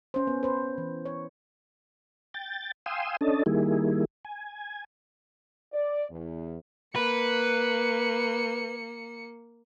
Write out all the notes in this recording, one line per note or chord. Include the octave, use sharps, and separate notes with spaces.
C#4 C5
B3
B4 C5
E3
C#5
G5 A6
F5 G5 G#5 C6 D#6 E6
C#4 D4 A4 D#5 A5
D#3 G3 A#3 E4 G#4
G#5
D5
E2
A#3 B4 C#7